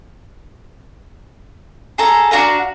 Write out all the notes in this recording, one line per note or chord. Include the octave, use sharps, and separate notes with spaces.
G#4 A4 A#5
D4 F#4 F5 A#5